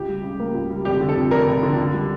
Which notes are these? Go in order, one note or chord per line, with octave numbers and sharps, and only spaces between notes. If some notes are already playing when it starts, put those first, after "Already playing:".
Already playing: C#2 G4
G3
C#3
A#3
C#2
G3
F1 G4
D3
A4
F2
F1 A#4
F1
D3
C#2
G3